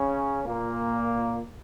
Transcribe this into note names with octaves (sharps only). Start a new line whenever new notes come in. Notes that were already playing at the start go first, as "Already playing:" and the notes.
Already playing: C#3 C#4
A#2 A#3